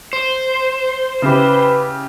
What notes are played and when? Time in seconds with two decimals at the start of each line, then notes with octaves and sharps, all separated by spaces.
0.13 C5
1.22 C#3 E4 G4 B4